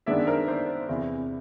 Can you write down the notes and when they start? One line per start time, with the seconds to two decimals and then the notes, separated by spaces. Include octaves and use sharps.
0.06 F#2 D#3 G#3 B3 D4 D5 E5
0.27 A#4 C5
0.47 C5 D5
0.89 E2 C3 E3